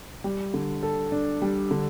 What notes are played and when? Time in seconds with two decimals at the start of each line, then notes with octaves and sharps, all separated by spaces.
0.24 G3
0.54 D3
0.83 A4
1.12 D4
1.42 G3
1.71 D3